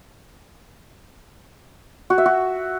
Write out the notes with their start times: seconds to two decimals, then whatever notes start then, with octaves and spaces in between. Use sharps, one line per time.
2.10 F#4
2.18 E5
2.26 F#4